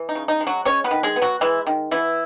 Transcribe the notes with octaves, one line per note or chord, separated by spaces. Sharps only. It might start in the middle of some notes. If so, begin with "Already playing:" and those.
Already playing: E3
D#4
C#3
D#4
G#3
F#3 F#4
G#3 C#4 C#5
B3 B4
D#3
G#3 G#4
B3
F#3 F#4
E3 G#3 E4
D#3
E3 B3 E4